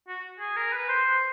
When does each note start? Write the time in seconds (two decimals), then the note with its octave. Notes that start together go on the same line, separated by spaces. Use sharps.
0.08 F#4
0.40 G#4
0.56 A#4
0.73 B4
0.89 C5